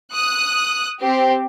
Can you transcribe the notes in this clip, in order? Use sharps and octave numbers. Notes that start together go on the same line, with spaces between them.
D#6 F#6
C4 G4